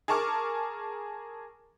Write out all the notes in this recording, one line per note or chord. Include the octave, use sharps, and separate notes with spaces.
G#4 A#4 A5 C#6 D6 F6